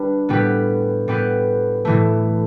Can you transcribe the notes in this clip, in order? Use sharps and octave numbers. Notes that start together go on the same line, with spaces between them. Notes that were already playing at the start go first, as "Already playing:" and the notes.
Already playing: G3 D4 B4
A2 G3 B3 G4 B4
A2 G3 B3 G4 B4
A2 E3 A3